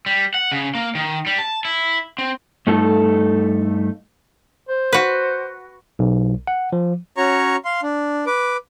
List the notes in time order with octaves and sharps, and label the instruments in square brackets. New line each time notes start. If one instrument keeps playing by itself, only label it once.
[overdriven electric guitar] G3
F#5
C#3
A#3
D#3
G3
A5
E4
C4
[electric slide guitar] G2 A3 D#4 A4
[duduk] C5
[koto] F#4 B4
[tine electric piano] B1
F#5
F3
[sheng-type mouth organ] C#4 F#4 C#5 A#5 C#6
F5 C6
D4
B4 D6